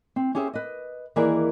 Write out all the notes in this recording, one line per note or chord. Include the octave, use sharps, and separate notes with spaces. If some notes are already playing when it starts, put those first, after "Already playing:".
C4
C#4 G4 G#4 C5 E5
B4 D#5
D#2 E3 G#4 A#4 B4 D5